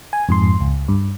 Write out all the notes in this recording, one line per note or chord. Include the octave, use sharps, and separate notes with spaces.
G#5
F2 G#2 C6
C#2
G2